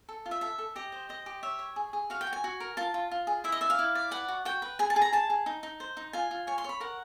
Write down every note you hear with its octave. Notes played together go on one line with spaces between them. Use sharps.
A4
F4
E5
A4 E5
A4
G4 D#5
C5
C5 D#5
G4
C#5 E5
C#5
G#4
G#4
F#4 F5
G5
F#4
G#5
F#4
A#4
F4 A5
F4
F4
G#4
E4 E5
D#5
D5 E5
F5
E4
D5
B4 F#5
F#4
F#4 G5
B4
G#4 G#5
A5
G#4
A#5
G#4 A5
G#4
D#4
D#4
C5
D#4
F4 G#5
F4
C#5 G#5
C6
C#5 B5
A#4 F#5